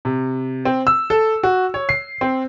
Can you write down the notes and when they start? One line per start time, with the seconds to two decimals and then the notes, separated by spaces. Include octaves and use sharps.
0.05 C3
0.65 C4
0.87 E6
1.10 A4
1.43 F#4
1.74 C#5
1.89 C7
2.21 C4